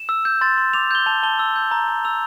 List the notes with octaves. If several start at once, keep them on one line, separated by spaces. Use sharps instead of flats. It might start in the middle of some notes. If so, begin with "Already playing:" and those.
Already playing: E7
E6
G6
C6 A6
C6
D6 F7
G6 G7
A5 F7
A5 G7
E6
G6
A#5
A#5
E6 F7